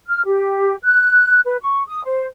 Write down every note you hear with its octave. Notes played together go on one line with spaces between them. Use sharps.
F6
G4
F#6
B4
C#6
D#6
C5